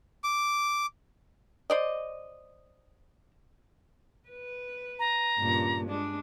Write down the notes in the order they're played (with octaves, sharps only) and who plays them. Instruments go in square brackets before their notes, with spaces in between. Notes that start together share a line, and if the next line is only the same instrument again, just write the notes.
[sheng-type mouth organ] D6
[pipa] C5 D5 D#5
[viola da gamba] B4
[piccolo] A#5
[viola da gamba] G2 A#2 C#3
G#3 D4